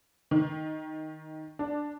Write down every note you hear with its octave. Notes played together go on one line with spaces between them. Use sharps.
D#3
D4